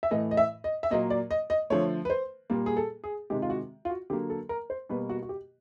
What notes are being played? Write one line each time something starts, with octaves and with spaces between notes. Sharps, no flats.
E5
A2 E3 A3 D#5
D#5
E5
D#5
E5
A#2 F#3 A#3 D#5
D5
D#5
D#5
D3 F3 A3 C#5
B4
C5
A#2 G3 A#3
G#4
A4
G#4
C3 D#3 G#3 G4
F4
F#4
F4
F#4
D3 F#3 A#3 G4
A4
A#4
C5
B2 G3 A#3 B4
F#4
F#4
G4